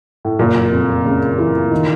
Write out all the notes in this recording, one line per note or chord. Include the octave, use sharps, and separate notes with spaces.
A2
F#1 A#2
F2
C#3
E3
D#3